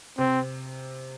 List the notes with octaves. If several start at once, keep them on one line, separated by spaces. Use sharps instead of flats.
C3 C4